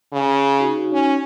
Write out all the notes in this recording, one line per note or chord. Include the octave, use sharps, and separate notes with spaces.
C#3
D#4 F#4
C#4